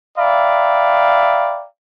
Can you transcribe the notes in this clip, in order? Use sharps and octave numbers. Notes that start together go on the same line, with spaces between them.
D5 E5 F5 G5 A#5 B5